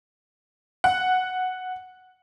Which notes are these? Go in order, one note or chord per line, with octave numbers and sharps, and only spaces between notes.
F#5